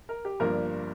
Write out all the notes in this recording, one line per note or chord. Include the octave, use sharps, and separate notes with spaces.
A#4
G4
G1 G2 F3 A#3 A#4